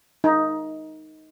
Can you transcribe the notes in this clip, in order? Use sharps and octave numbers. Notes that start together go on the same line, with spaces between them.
D#4